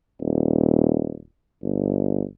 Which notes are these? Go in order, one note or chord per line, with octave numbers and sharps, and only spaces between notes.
D#1
G1